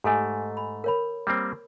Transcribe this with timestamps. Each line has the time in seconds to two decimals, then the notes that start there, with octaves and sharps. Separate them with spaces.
0.04 G#2 A3 G4 A4 G#5
0.57 B5
0.84 A#4 C#5 B5
1.27 G3 A#3 C4